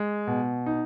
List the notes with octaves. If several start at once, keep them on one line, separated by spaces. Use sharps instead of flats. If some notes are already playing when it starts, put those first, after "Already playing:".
Already playing: G#3
B2
D#4